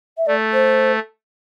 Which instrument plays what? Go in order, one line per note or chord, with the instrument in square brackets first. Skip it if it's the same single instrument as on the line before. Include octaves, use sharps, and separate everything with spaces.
[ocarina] E5
[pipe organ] A3 [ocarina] D5
[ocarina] C5